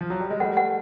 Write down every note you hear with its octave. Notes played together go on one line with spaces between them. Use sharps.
F3
F#3
G3
G#3
G3 A3 F#5
F#5